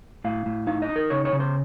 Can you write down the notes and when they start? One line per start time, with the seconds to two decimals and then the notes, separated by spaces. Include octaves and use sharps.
0.24 A2 F5
0.46 A2
0.67 D#4 F5
0.82 D#5
0.89 D#4
0.96 A#4
1.10 C#3 C#5
1.25 C#5
1.33 C#3
1.40 C5